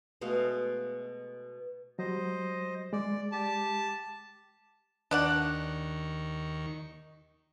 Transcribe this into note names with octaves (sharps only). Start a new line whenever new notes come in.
B2 G#3 A3 F5
F#3 G3 C5 D#5
G#3 D5
G4 A5
D#2 D#3 D4 D5 F#5 C#6